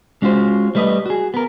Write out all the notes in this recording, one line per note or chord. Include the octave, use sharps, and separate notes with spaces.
G#3 C#4 F4 F#4 C5
G3 A3 B4 D5 D#5
F#4 G#4
B3 A#4